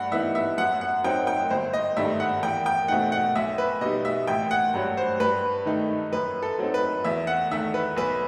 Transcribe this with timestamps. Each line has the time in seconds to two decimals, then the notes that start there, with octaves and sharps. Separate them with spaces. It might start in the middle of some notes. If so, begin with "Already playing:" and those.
Already playing: G2 F#5
0.12 E3 B3 D#4 E5
0.35 E5
0.57 F#2 F#5
0.81 F#5
1.04 F#3 C4 D#4 G5
1.27 G5
1.50 G1 C5
1.73 D#5
1.97 G2 D#3 A3 D#4 E5
2.20 F#5
2.43 E2 G5
2.66 G5
2.88 B2 A3 C4 D#4 F#5
3.12 F#5
3.35 B1 E5
3.58 B4
3.81 B2 G3 D#4 D#5
4.05 E5
4.27 A1 G5
4.51 F#5
4.74 G2 F#3
4.97 C5
5.20 G2 B4
5.66 D#3 A3 D#4
6.12 F#2 B4
6.43 A4
6.59 F#3 C4 D#4
6.74 B4
7.04 E2 E5
7.27 F#5
7.51 D#3 A3 E5
7.74 B4
7.97 B1 B4